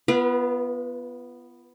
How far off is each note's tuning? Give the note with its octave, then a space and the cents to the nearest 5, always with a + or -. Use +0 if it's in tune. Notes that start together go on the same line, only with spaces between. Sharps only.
B3 +0 F4 -30 B4 -40